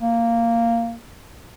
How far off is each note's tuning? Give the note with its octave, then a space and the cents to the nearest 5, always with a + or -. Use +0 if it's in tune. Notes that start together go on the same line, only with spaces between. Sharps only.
A#3 -10